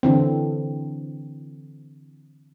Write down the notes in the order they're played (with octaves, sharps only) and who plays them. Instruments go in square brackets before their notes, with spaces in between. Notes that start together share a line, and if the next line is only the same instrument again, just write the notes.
[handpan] D3 E3 C4